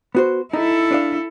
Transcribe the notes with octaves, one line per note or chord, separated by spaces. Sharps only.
B3 F#4 C5
D#4 E4 A4
D4 D5 F5